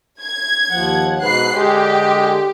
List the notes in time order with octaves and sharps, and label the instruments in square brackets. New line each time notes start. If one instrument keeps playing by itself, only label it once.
[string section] G#6
[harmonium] D#2 F3 F#5
[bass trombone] G#2 [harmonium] B2 B4 [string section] F#6 C7
[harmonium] D3 [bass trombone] G#3 [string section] G4